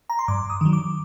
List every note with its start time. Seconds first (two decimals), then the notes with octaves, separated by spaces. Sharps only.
0.10 A#5
0.19 C6
0.28 G2 D6
0.50 D#6
0.61 D#3 F#3
0.73 D6